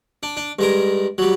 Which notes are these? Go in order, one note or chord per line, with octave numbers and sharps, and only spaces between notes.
D4
D4
G2 G#3 A#4
F#3 G3